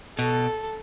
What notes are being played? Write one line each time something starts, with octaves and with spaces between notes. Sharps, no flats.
B2 A4